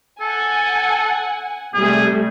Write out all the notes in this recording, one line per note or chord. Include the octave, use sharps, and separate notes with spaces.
A4 F#5 G#5
C3 G3 A3 G#4